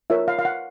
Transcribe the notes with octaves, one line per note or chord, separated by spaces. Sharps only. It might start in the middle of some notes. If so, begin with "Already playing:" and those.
F4 A#4 C#5 E5
F5
F5
F#5